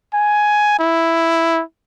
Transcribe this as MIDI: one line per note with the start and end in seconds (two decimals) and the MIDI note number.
0.14 0.79 80
0.79 1.62 64